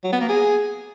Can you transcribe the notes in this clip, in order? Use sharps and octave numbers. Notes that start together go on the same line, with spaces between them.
F#3
B3
A#3
G#4